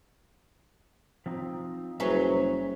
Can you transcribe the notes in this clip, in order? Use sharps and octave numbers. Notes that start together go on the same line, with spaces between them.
F3 C4 D#4
F#1 F#3 G3 G#4 B4 C5 E5 A#5